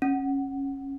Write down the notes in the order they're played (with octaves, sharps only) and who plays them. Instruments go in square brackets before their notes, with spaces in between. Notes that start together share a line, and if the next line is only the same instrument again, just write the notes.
[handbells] C#4